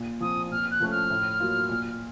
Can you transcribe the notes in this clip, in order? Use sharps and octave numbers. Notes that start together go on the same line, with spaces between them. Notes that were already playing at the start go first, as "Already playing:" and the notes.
Already playing: A#2
F3 C4 D#6
A#2 F6
F#6
F3 A3 C#4
F6
A2
F#3 A#3 F4
A#2